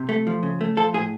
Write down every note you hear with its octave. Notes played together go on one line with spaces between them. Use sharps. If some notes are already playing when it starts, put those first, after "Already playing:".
Already playing: C3
A3
F3
C#3
A3
F3 A4
A2 G#4